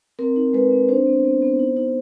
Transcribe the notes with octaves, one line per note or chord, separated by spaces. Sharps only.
C4 A#4
D#4
G#3 B4
C4
D4 C5
B3
B3
B3
D#4
D#4